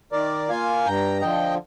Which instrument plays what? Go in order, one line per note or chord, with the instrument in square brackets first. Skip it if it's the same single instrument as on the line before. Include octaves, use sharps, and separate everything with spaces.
[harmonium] D#3 A#4 D5
A#3 F4 F5 G#5
G2 G5 A#5
D3 F3 D#5 G5